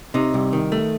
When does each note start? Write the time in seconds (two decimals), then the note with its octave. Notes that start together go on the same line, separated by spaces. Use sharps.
0.14 C3 D#4
0.34 C2
0.53 D#3
0.72 A3